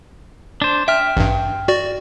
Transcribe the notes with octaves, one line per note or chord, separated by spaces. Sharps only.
D4 C5
E5 G5 F6
A1 G2
F#4 D5